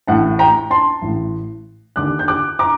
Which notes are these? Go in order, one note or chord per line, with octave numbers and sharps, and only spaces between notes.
A1 A2 F#5 A5
G5 A#5
A5 C6
A1 A2
D#2 D3 D6 F#6
G6
D6 F#6
A#5 D6